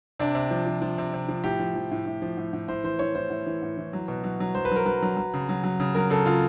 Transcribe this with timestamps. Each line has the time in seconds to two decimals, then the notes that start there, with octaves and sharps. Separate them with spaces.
0.20 C3 D4
0.35 C3
0.51 F3
0.67 F3
0.82 F3
0.98 C3
1.14 C3
1.29 F3
1.44 A2 G4
1.60 F3
1.75 F3
1.91 A2
2.06 A2
2.22 F3
2.37 A2
2.53 A2
2.68 A2 C5
2.84 E3 C5
2.99 E3 C#5
3.15 A2 C5
3.30 A2
3.46 E3
3.63 A2
3.77 E3
3.93 F#3
4.08 B2
4.24 F#3
4.40 F#3
4.55 F#3 C5
4.65 B4
4.71 F#3 A#4
4.86 F#3 B4
5.02 F#3
5.17 F#3
5.34 C#3
5.49 F#3
5.63 F#3
5.80 C#3
5.95 F#3 A#4
6.10 C#3 A4
6.26 C#3 F4